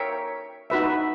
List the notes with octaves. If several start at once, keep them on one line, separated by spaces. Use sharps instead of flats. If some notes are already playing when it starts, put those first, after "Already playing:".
Already playing: A#4 C#5 E5 G5
D#4 F#4 B4 E5